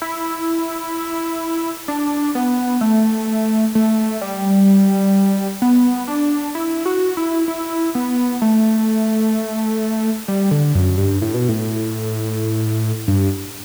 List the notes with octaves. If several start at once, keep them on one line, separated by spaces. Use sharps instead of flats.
E4
D4
B3
A3
A3
G3
B3
D4
E4
F#4
E4
E4
B3
A3
G3
D3
F#2
G2
A2
B2
A2
G2